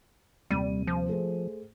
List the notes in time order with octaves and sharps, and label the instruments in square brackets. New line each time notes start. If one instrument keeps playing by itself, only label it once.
[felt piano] D#1 C3 D#7 [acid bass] G3
[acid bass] F3
[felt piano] A3 G#4 C5